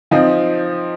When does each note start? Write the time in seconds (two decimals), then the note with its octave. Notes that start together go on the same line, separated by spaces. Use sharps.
0.11 F3 C4 D#4